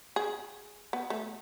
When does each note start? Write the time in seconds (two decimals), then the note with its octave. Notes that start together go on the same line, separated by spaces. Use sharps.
0.16 G#4
0.93 B3
1.10 A3